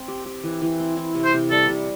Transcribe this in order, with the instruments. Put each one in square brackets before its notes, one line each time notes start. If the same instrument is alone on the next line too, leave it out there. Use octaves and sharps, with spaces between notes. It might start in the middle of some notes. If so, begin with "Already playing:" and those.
Already playing: [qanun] C4
G4
G4
E3
E3
C4
E4
C3
[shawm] C5
[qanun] C3
[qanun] G3 [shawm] A4
[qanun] C3